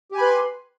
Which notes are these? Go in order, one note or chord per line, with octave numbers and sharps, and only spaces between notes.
G4 B4 G#5 B5 C6